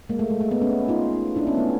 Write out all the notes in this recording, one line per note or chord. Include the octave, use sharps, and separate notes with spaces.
G#3 A#3
A3
G#3
A3
A3 B3
B3 C#4
D#4 F4
D4 E4
B3 C#4
A3 B3